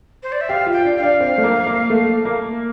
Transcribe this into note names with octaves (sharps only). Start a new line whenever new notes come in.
C5
D5
E5
G4 F5
F4
G5
D4
F5
D4
C4
A3
A#3
A#3
A3
A#3